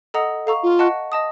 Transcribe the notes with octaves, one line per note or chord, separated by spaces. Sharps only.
A4 D#5 F#5 A#5 D#6
A4 F5 A#5 C#6
F4
D#5 F#5 A5 C#6 F#6
D#5 A5 D#6